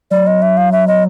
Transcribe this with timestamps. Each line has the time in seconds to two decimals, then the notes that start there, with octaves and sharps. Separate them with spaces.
0.11 F#3 D5
0.27 D#5
0.42 E5
0.57 F5
0.72 E5
0.88 D#5